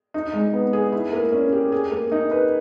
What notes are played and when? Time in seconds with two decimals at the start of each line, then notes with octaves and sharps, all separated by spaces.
0.14 D#4
0.33 G#3
0.53 B3
0.73 G#4
0.92 E4
1.13 A#3
1.32 C#4
1.52 G4
1.72 G#4
1.92 A#3
2.12 D#4
2.31 B4